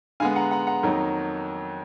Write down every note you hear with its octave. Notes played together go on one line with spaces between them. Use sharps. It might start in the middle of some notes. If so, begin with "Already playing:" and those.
D3 G#3 B3 F5 G#5
F#5 A#5
F#5 A#5
F#5 A#5
F2 D#3 F#3 A#3 D#4